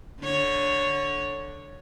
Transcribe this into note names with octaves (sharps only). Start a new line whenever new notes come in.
D3 C#5